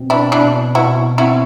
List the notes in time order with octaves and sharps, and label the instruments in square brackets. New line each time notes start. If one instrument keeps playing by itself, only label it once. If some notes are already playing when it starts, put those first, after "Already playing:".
Already playing: [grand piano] B2 C4
[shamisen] D4 E4
[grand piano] B2 [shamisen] D4 E4
[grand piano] B2 [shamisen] E4 F#4
[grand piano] C4 [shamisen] E4 F#4